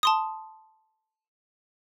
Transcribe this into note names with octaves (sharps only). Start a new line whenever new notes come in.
A5 C6 D#6